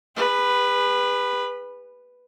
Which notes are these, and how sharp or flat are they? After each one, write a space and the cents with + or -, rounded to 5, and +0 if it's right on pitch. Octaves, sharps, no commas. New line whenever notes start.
G#4 -45 B4 +0